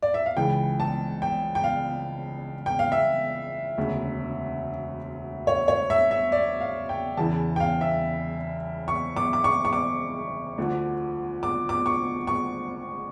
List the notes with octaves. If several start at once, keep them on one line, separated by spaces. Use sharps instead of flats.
D5
E5
F5
C#2 C#3 E3 G5
A5
G5
G5
F5
G5
F5
E5
E1 D2 C#3
C#5
C#5
E5
E5
D5
F5
G5
E2 C#3 E3 A5
G5
F5
E5
C#6
D6
D6
C#6
C#6
D6
D2 D3 F3
D6
D6
C#6
C#6